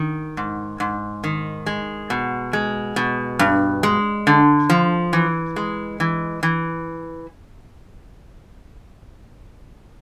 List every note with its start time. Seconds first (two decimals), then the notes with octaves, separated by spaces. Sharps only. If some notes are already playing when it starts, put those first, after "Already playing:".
Already playing: D#3
0.37 G#2
0.80 G#2
1.24 D#3
1.66 G#3
2.10 B2
2.53 G#3
2.96 B2
3.39 G2
3.83 G#3
4.27 D3
4.70 F3
5.13 E3
5.56 G#3
6.00 E3
6.43 E3